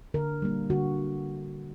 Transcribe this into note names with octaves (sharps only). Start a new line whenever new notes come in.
D3 A#4
G3 A#3
D3 F#4